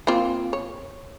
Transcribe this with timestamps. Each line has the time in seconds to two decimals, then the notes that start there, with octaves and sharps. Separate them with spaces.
0.07 A#3 C4 F4
0.53 C#5